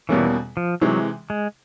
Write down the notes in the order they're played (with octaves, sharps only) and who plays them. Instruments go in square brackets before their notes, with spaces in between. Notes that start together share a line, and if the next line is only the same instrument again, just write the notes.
[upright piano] E2 B2 G3 A#3 C#4 [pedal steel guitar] E3
[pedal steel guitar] F3
[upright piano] C3 E3 G#3 [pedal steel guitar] F#3
[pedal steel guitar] G#3